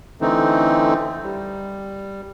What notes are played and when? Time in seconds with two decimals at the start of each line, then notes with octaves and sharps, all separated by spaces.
0.21 D3 E3 A3 C4 D#4
1.23 G3